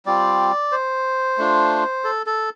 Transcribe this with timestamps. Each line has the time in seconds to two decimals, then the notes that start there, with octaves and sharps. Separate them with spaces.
0.06 G3 C4 F4 D5
0.72 C5
1.38 A3 D4 F4
2.04 A4
2.26 A4